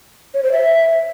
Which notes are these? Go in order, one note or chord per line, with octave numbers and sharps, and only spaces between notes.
C#5
C5
E5